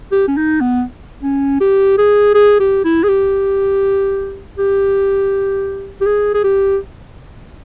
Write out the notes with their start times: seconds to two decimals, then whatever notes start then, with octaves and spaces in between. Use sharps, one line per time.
0.12 G4
0.28 C#4
0.37 D#4
0.61 B3
1.23 C#4
1.60 G4
1.98 G#4
2.34 G#4
2.60 G4
2.85 E4
3.04 G#4
3.09 G4
4.58 G4
6.01 G4
6.06 G#4
6.34 G#4
6.44 G4